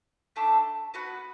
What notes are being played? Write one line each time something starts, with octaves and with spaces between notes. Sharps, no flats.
A3 D4 A4 E5
B3 F#4 B4